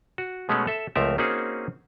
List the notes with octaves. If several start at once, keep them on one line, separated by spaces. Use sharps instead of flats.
F#4
B2 G#3 A3 B3 C#4
A4 E5
C#2 F3 A3 C4 A#4 E5
A#3 C4 C#4 D#4 F#4 G#4